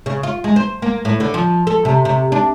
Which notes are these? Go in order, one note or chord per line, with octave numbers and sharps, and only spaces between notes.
C#3
F4
G#3
C5
A#3
A2
D3
F3
A4
C3
C3
D4